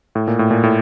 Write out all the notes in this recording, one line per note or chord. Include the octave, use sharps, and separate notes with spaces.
A2
A#2
A2
A#2
A2